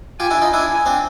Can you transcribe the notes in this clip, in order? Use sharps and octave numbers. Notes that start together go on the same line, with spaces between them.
F4 G4 G#5
D4 E4
D#4 F4
D4 E4 G#5
C4 D4